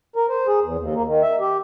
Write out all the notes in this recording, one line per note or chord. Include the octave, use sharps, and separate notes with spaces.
A#4
C5
G#4
E2
D#2
A#3
D#3
E5
G4